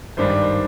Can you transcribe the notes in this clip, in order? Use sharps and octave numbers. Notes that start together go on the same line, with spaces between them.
G#1 G2 D#3 G3 D4 C5
D5
C5